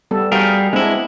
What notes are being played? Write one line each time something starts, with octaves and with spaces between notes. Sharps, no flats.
G3 B3 A4
G3 F#4 G#4 A#4 F5 G5
G#3 B3 C4 D4 E4